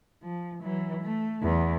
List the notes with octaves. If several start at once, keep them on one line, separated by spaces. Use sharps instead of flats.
F3
E3 F#3
A3
E2